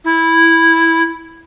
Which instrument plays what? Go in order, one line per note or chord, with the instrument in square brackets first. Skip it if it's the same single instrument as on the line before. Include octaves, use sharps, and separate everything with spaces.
[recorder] E4